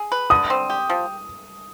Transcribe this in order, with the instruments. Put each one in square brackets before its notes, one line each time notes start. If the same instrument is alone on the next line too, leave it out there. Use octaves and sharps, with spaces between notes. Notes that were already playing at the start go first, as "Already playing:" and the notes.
Already playing: [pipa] G#4
B4
[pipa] D3 [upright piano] D#6
[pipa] C4
G4
F3